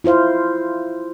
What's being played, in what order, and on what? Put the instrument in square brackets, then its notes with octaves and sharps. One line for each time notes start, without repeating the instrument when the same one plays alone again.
[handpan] E4 F4 C5 F5